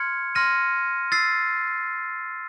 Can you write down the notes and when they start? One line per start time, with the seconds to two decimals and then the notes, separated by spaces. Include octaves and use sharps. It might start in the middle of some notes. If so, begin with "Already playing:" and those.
Already playing: C6 F6 G#6 C#7
0.35 C6 F6 A#6 D#7
1.12 E6 A6 C7